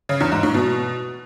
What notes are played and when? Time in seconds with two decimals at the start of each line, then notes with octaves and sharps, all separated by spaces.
0.09 C#3
0.20 E2
0.32 G#2
0.43 A2
0.54 B2